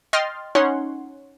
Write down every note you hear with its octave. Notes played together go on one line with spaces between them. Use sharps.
D#5 G5 C6 F6 A6
C#4 D#4 C#5 F#5 C6